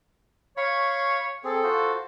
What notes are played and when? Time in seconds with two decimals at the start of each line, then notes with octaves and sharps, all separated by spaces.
0.57 C#5 F5 B5 C#6
1.44 C4 G#4 A4
1.63 F4 F#4 C5